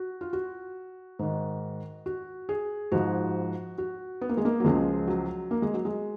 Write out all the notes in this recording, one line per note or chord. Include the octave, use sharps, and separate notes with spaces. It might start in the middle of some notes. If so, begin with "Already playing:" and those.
Already playing: F#4
F4
F#4
G#2 D#3
F#4
G#4
G#2 F3 F#4
F#4
B3
A#3
G#3
A#3
F#3
C#2 C#3 F3 G#3
F#3
A#3
G#3
F#3
G#3